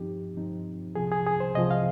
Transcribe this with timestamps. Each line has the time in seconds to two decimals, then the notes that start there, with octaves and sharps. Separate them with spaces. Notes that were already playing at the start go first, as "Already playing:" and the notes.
Already playing: G2 F3 C4 D#4 G4
0.36 G2 F3 C4 D#4
0.95 C2 C3 F3 G#4
1.12 G#4
1.27 G#4
1.40 C5
1.55 C2 C3 F3 D#5
1.71 F5